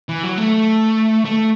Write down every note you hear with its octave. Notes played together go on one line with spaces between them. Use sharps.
E3
F#3
A3
A3